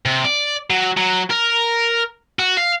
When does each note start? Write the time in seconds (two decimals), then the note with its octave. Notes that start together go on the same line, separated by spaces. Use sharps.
0.06 C3
0.25 D5
0.70 F#3
0.97 F#3
1.30 A#4
2.39 F#4
2.57 F5